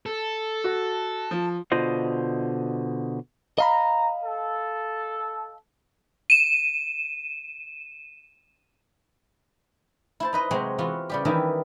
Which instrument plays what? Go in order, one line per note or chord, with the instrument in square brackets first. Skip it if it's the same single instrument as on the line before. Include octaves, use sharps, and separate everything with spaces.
[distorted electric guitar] A4
[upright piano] F#4
F3
[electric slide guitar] B2 D3 F4 C5 D#5
[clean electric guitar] D#5 F5 B5 [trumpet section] A#5
[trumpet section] A4
[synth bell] D#7 E7
[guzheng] E4 C5 A5
D#4 B4 D#5
C3 F#3 G#3 C4 F#4
E3 B3 F4 F#4
C#3 G3 G4
D#3 E3 G3 D#4 E4